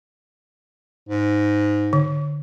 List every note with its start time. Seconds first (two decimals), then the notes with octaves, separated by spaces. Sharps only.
1.09 G#2
1.93 D3